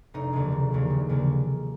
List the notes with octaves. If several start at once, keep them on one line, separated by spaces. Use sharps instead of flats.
F1 D#4
D#2 C#3 F3 G#3
F1
D#2 C#3 F3 G#3
F1
D#2 C#3 F3 G#3